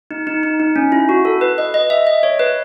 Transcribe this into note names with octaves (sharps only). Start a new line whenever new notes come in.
D#4
D#4
D#4
D#4
C#4
E4
F#4
A4
B4
D#5
D#5
E5
D#5
C#5
B4